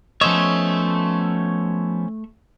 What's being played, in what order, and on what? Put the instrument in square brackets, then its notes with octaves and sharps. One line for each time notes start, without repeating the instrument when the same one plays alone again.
[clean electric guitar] F3 B3 D#5 [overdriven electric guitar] A3 E5 [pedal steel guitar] C#4 C5 C#5